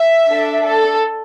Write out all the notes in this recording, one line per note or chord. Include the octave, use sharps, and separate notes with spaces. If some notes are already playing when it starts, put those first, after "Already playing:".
Already playing: E5
D4 A4
A4